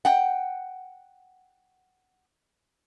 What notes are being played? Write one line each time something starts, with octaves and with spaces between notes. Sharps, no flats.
F#5 G5